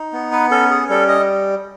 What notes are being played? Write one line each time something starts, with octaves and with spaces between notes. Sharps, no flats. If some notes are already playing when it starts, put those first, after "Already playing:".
Already playing: D#4
B3
B4
C#4 A4
G#4
G3 A4
D#5